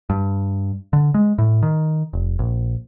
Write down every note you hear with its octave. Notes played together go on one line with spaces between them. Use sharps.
G2
D3
G#3
A2
D#3
F1
A#1